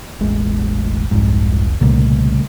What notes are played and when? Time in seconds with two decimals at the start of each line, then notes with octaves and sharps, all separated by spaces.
0.21 E1 A1 G#3
1.11 F1 C2 G#2
1.81 C2 A#2 C#3 G3 A3